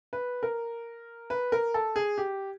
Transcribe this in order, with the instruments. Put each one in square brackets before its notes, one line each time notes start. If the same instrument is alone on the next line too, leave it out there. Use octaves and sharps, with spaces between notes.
[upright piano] B4
A#4
B4
A#4
A4
G#4
G4